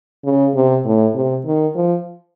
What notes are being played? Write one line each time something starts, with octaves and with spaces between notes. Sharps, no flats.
C#3
C3
A2
C3
D#3
F3